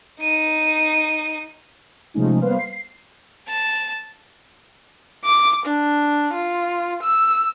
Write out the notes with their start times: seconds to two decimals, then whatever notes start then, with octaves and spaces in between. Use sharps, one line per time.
0.21 D#4 D#7
2.14 C3 F3 G#3 A3 C#4 D#4
2.41 G3 A#3 B3 B4 C5 F5
2.59 C7
3.48 A5
5.24 D6
5.66 D4
6.34 F4
7.03 E6